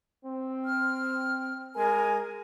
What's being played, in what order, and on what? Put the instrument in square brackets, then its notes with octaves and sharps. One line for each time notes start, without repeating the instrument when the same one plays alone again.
[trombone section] C4
[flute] F6
[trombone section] G#3 A#4 [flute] G#5